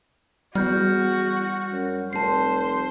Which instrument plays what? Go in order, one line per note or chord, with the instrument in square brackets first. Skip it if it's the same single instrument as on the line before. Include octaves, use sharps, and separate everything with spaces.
[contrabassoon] E2 [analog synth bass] G3 [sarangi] F#4 [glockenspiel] F6 G6
[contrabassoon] F#2
[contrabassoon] F1 [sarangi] C5 [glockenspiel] A5 C7